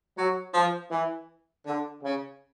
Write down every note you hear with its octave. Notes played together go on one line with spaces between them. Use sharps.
F#3
F3
E3
D3
C#3